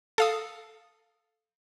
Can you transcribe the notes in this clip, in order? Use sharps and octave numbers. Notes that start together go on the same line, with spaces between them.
A4 F5 D#6